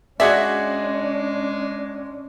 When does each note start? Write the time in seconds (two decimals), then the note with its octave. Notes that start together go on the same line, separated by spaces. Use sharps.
0.20 G#3 C#4 D4 F#4 G#4 D5 E5